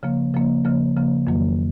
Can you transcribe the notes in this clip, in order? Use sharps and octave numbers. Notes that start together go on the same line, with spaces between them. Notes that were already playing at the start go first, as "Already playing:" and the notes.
C#3 F3 A#3
C#3 F3 A#3
C#3 F3 A#3
C#3 F3 A#3
F2 D#3 F#3 A#3